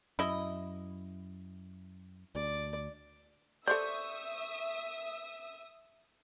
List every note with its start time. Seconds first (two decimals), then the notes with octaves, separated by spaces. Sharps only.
0.19 F#2 E4 D#5
2.35 D2 D5
3.67 A4 C5 D5 E5 C#6 D#6 E6 G6